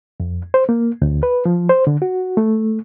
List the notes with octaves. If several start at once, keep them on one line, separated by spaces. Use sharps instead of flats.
F2
C5
A#3
D2
B4
F3
C5
D3
F#4
A3